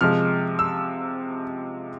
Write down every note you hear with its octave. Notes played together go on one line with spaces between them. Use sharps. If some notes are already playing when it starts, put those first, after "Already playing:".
C3 F3 G#3 F6
E6